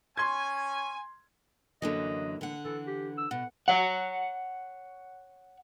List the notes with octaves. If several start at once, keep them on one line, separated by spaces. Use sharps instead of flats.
C#4 G#5 C6 G#6
F#2 D3 E3 F#3 A#3 A4 D#5
D3 F#5
E3 A4
G4
E6
B2 F#5
C#5 F#5